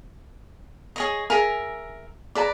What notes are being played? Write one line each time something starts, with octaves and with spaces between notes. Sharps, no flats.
G#4 C#5 D#5
G#4 A#4 E5 G#5
G#4 B4 D5 A5 A#5